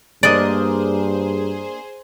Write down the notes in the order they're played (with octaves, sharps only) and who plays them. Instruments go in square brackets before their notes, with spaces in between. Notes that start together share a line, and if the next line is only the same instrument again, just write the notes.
[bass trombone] G2 [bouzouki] A#3 D4 D#5 [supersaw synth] G#4 C5 [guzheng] D5